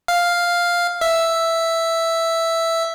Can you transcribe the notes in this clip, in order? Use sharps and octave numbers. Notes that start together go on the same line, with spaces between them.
F5
E5